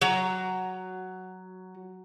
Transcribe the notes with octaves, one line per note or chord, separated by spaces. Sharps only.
F#3 A#5